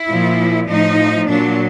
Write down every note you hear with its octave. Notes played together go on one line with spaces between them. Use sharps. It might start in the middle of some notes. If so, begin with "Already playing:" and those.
Already playing: E4
A#2 F3
A2 F3 D#4
A#2 F#3 D4